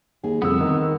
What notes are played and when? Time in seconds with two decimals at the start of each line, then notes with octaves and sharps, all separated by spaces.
0.24 D#2 G#4
0.42 C2 F2 D3 B3 E6
0.61 D#3